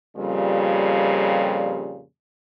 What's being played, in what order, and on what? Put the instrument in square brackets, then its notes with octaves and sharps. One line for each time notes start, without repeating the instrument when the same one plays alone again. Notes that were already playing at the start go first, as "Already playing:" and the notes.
[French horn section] F2 A#2 C#3 G3